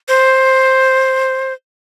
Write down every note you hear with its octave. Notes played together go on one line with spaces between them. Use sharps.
C5